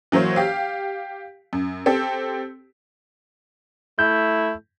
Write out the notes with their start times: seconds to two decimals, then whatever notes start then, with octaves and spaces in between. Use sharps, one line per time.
0.12 E3 F#3 A#3 C5 C#5
0.36 G4 F5
1.53 F#2
1.86 C4 G4 A4
3.99 A3 E4 G6